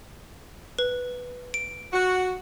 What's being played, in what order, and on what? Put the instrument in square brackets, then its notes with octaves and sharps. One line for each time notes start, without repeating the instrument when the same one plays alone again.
[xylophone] B4
D7
[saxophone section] F#4